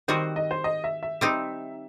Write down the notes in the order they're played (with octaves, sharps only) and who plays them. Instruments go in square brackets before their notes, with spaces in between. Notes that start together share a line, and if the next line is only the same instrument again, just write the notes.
[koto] D#3 G3 C4 F#4 [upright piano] C5
[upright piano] D#5
C5
D#5
E5
E5
[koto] G3 C4 D#4